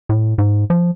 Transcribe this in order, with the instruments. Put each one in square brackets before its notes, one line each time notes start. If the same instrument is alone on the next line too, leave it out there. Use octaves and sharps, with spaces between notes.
[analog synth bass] A2
G#2
F3